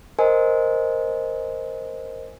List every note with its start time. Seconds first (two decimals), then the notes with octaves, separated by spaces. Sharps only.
0.19 A#4 C5 D#5 G#5